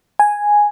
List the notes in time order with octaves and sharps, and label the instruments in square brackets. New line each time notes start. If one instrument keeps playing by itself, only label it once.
[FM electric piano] G#5